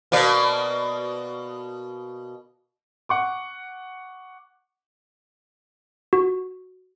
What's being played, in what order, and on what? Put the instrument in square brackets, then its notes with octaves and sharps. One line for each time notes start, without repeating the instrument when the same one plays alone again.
[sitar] B2 A#3 D5
[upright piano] F#5 C#6 D6
[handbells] F#4